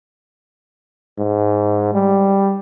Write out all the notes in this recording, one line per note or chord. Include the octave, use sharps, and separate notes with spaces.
G#2
G3